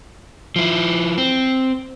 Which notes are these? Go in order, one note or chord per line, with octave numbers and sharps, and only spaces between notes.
F3 E4
C4